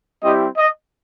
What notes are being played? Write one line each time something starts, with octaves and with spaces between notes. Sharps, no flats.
G3 C4 E4 G4 D#5
D#5